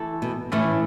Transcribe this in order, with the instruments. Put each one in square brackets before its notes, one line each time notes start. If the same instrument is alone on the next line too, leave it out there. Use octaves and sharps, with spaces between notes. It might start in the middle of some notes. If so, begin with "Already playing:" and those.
Already playing: [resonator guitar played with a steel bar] E3 A3 E4 A4
[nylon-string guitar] B2
[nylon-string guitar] A2 [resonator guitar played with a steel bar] E3 A3 C#4 E4 B4